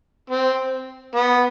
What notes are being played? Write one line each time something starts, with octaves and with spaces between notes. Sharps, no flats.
C4
B3